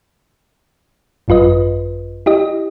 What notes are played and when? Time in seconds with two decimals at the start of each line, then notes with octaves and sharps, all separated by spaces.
1.28 G#1 F#2 F4 B4 D#5
2.26 E4 G4 D#5